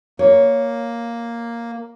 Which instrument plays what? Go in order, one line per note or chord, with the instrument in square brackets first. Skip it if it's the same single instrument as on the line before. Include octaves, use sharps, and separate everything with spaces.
[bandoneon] A#3 [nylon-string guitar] C#5